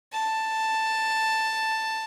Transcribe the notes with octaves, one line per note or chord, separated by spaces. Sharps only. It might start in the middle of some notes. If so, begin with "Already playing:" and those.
A5